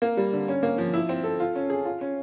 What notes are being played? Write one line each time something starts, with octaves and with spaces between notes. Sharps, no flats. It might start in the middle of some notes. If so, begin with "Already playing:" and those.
A#3
G3
D3
C#4
A#3
F3
E4
C4
A4
F4
C#4
G#4
F4
C#4